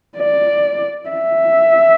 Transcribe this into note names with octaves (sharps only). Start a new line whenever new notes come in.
D5
E5